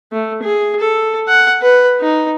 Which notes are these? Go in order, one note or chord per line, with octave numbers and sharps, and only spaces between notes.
A3
G#4
A4
F#5
B4
D#4